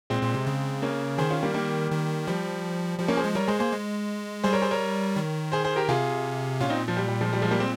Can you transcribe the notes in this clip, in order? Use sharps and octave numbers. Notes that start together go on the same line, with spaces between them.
A#2 G#3 C4
A#2
C3
C#3
A#3 C#4
D#3 G#4 C5
C#4 F4
G3 A#3
G3 A#3
D#3
F3 G3
F3 G3
A#3 C#4
G#4 C5
G#3
G3 A#4 C#5
G#3 G#4 C5
A#3 G#4 C5
G#3
G3 G#4 C5
A#4 C#5
G#4 C5
A#4 C#5
D#3
G#4 C5
G#4 C5
G4 A#4
C3 F4 G#4
A#2 C#4 F4
C4 D#4
F3
G3
G3
F3 G#3
G3
F3 G#3
G3 A#3
G#3 C4